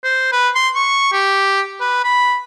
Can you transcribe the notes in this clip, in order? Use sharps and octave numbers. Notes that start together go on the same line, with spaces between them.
C5
B4
C6
C#6
G4
B4
B5